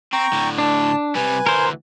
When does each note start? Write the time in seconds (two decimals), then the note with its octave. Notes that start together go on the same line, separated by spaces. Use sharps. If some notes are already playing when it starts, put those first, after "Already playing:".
0.13 C4 G5 A#5 C#6
0.33 A2 D3
0.58 D4 A5
1.15 C3 G3 B4 G#5
1.46 D2 E3 A#4 C5